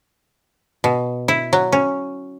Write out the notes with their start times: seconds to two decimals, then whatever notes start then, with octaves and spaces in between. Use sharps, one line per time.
0.84 B2
1.28 E4
1.53 F#3
1.72 C#4